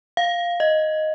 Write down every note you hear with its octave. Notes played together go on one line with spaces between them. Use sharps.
F5
D#5